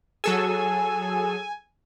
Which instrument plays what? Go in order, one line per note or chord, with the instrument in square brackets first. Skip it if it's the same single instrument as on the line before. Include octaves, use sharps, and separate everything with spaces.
[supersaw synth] F#3 A4 E6 [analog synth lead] G#4 [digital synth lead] G#5